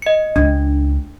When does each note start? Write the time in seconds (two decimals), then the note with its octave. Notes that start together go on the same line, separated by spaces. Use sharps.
0.02 D#5 C#7
0.36 C#2 D4